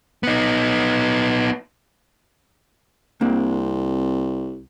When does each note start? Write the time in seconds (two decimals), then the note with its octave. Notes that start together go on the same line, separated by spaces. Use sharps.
0.23 B3 D#4
3.21 C2 A#3 C4 D4